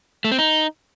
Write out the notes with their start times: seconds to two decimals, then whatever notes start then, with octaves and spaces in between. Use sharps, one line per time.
0.24 A3
0.32 C4
0.39 D#4